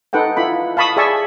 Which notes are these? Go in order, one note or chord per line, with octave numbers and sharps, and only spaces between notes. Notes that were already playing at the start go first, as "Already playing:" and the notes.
D#4 A4 B4 F#5 G5
E4 F4 B5
F5 A5 B5 C#6 D#6
G#4 D5 E5 G#5 A5 C#6